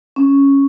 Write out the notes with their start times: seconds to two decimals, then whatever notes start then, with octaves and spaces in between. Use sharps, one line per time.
0.16 C#4